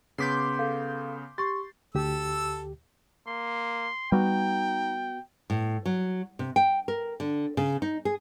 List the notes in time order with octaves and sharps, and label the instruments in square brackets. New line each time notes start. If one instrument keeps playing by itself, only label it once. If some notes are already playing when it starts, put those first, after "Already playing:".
[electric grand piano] C#3 B3 B6 [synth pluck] C6 D6 G6
[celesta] A4 F5
[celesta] G4 C#6 [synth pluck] C6 [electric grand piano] A6
[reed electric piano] D2 G4 [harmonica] A4 E6
[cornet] A#3 [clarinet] C6
[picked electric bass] G3 [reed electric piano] B3 F#4 [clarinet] D#4 [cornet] G5
[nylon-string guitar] A2
F#3
C3
G5
A#4
D3
C#3
D#4
G#4